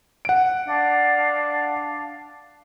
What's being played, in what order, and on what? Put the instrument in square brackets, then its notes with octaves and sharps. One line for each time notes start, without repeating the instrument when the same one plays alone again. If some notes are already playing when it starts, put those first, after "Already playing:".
[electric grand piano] F#5 D7
[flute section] D4 F5